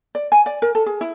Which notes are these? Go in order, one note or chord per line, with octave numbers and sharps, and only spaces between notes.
D5
G#5
D5
A#4
A4
G#4
E4